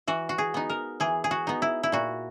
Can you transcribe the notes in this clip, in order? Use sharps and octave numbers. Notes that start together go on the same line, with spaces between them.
E3 F#4
F#4
G#4
B3 D#4
A#4
E3 G#4
G#4
F#4
B3 D#4
E4
E4
A#2 F#4